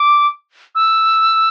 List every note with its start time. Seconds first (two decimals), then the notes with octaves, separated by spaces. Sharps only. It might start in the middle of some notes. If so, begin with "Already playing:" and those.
Already playing: D6
0.75 E6